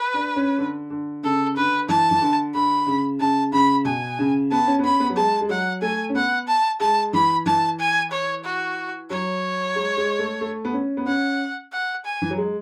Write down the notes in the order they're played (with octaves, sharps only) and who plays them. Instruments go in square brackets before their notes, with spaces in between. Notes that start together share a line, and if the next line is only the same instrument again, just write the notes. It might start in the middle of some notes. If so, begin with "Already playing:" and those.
Already playing: [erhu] B4
[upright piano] D4
C#4
D3
D3
[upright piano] C#3 [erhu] A4
[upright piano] D3 [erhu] B4
[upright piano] E3 [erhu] A5
[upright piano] E3
D3
[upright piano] D3 [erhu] B5
[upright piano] C#3
[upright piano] C#3 [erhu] A5
[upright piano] C#3 [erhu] B5
[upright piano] B2 [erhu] G#5
[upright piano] C#3
[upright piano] B3 [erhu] A5
[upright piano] C#4
B3
[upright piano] C#4 [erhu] B5
[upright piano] B3
F#3
[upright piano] G#3 [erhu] A5
[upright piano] G#3
[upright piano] F#3 [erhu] F#5
[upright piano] A3 [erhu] G#5
[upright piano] C#4
[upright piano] B3 [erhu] F#5
[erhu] A5
[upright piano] G#3 [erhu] A5
[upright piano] E3 [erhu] B5
[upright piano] E3 [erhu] A5
[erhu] G#5
C#5
F#4
[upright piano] F#3 [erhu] C#5
[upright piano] G#3
G#3
A3
A3
B3
C#4
B3
[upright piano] C#4 [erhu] F#5
[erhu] F#5
G#5
[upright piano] E3
F#3
G#3